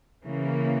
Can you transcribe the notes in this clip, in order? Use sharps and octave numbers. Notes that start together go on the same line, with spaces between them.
C#3 E3 A#3